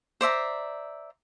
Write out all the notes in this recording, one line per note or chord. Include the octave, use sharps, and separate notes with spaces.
C5 D5 E5 A#5